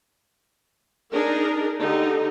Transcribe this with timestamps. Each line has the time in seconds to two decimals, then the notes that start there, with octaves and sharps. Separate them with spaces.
1.13 D4 D#4 G#4 A#4
1.80 D3 D#4 G4